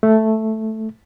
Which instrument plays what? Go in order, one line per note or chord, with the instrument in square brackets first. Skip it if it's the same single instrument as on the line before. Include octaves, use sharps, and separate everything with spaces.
[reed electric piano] A3